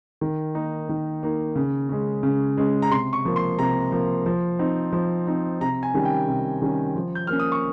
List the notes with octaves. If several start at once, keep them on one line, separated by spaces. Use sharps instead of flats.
D#3
A#3 D#4
D#3
A#3 D#4
C#3
G#3 C#4
C#3
G#3 C#4
A#5
C3 C6
C#6
F3 A#3
C6
C3 A#5
F3 A#3
F3
C4 D#4
F3
C4 D#4
C3 A#5
G#5
D#3 G3 C#4
G5
C3
D#3 G3 C#4
F3
G6
A#3 C#4 F6
D#6
C#6